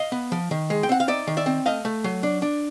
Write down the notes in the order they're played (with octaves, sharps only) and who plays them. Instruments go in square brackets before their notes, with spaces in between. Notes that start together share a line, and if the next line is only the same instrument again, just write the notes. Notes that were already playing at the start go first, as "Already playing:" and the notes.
Already playing: [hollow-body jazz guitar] D#5 F5
B3
F3
D#3
G#3
G5
C4 F#5
F5
D#4 D5 E5
D#3
D5 E5
C4
A3 D#5 F5
A3
F#3
D4
D4